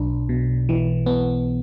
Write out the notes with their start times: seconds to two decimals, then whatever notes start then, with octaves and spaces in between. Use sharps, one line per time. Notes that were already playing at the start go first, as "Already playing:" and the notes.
Already playing: B1 D4
0.29 B2
0.69 E3
1.06 B3